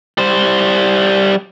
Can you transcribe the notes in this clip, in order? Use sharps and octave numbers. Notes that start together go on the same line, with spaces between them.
G3 C5